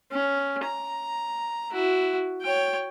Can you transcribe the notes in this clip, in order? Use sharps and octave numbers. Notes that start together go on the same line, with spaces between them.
C#4
A#5
E4 F#4
C#5 G5